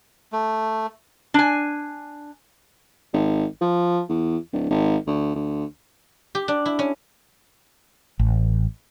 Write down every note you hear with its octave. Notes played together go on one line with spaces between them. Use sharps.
A3
D4 G#5
G#1
F3
E2
D1
G#1
D2
D2
G4
D4
E4
C#4
A1